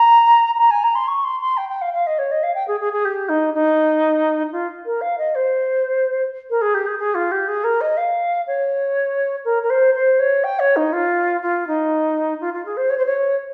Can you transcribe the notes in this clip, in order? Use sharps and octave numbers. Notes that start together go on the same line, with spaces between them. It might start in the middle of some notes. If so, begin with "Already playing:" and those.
Already playing: A#5
A#5
G#5
A#5
C6
C#6
C6
C6
G5
G5
F5
F5
D#5
C#5
D#5
F5
G5
G#4
G#4
G#4
G4
D#4
D#4
F4
A#4
F5
D#5
C5
A#4
G#4
G4
G#4
G#4
F4
G4
G#4
A#4
D#5
F5
C#5
A#4
A#4
C5
C5
C#5
G5
C#5
D#4
F4
F4
D#4
F4
F4
G#4
C5
C#5
C5
C#5